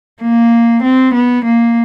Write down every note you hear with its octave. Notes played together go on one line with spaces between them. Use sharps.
A#3
C4
B3
A#3